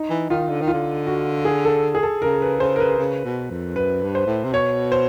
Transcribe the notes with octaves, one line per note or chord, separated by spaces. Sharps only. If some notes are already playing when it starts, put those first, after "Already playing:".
Already playing: D#4
E3
D#3 F4
D3
D#3
F4
D3
F#4
G#4
A4
G#4
A4
C#3 A#4
B4
C#3 C5
A#4
B4
C#3
B2
F2
F#2 B4
G2
C5
A2
C3
B2 C#5
C5